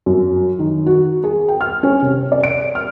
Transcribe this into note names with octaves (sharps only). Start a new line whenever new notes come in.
F#2
D#3
F#4
G#4
G5
F6
C#4
C3
D5
D7
F6